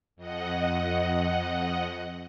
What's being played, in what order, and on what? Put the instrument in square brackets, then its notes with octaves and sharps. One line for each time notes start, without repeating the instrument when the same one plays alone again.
[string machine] F2 D#5 F#5